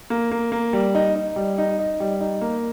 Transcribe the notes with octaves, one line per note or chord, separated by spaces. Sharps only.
A#3
A#3
A#3
G3
D#4
D#4
G3
D#4
D#4
G3
D#4
A#3